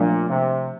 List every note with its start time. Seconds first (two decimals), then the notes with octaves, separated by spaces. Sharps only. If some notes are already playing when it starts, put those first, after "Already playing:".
Already playing: A#2 F3 A3 D4
0.28 C3